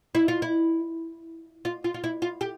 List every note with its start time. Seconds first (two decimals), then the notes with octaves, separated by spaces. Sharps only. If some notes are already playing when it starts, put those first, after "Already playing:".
0.15 E4
0.28 F4
0.42 E4
1.65 F4
1.84 F4
1.94 F4
2.04 E4
2.22 F4
2.41 G4